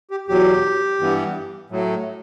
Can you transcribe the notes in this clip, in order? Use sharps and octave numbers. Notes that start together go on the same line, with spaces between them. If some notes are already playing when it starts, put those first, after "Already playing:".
G4
E2 B2 F#3 G4
G2 E3 B3
A2 F#3 A3